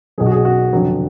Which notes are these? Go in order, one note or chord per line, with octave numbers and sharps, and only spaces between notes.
B1 B2 F#3 G#4
F#4
G#4
F#4
F1 F2 D3 F#3